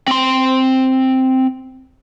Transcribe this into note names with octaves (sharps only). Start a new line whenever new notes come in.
C4 C6